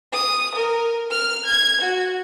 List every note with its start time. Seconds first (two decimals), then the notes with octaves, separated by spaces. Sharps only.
0.13 D#6
0.56 A#4
1.11 F6
1.46 G#6
1.81 F#4